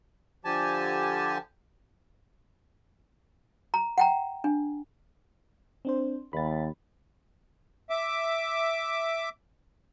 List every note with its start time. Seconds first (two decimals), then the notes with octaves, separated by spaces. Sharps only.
0.45 D3 F3 G4 G#5 A5
3.74 A#5
3.98 F#5 G5 A#5
4.44 D4
5.85 C4 D4 C5
6.33 D#2 B5 A6
7.90 E5 D6